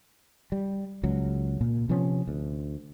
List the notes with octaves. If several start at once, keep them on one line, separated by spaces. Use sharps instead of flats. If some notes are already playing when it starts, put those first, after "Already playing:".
G3
C#2 F#3
A#2
C3 F3 B3 C#4
D2